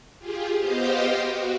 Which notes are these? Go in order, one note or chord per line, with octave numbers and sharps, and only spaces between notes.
F4 G4 G#4
B3 G4 C5 D#5 F5 G5
F#4